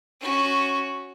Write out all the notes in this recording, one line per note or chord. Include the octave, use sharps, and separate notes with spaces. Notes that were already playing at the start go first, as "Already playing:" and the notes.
C#4 F#4